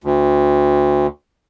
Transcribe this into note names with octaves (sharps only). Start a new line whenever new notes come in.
D2